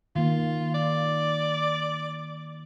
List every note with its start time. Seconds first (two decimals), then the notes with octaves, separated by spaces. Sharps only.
0.16 D#3 A#3 F4
0.74 D5